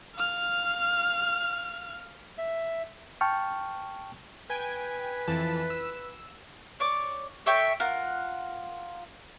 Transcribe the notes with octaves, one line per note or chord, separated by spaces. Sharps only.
F5 F6
E5
G5 A5 C#6 F6
B4 G5 G#5 G#6
F2 E3 A5
E6
C#5 D5 D6
A4 C#5 E5 G5
F4 A#4 F#5